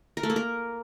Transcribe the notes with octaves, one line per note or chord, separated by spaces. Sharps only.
A#4
A3
A#3
A#4